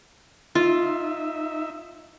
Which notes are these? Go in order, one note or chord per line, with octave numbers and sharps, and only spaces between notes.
D#4 F4 E5